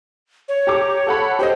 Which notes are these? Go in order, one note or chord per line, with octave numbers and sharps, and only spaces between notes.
C#5
G4 A#5 D6
A4 F#5 B5
G4 C5 D#5